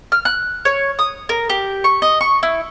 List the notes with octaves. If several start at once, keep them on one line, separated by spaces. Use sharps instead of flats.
F6
F#6
C#5
D#6
A#4
G4
C#6
D#5
C#6
E4